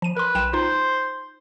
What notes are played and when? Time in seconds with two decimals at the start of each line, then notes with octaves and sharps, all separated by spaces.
0.02 F3 D#7
0.17 A#4 B4 C6
0.35 B1 G5 E7
0.53 D#4 F4 C5